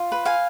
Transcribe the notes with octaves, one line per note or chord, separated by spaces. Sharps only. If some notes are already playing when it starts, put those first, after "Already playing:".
Already playing: F4
B4
F5 G#5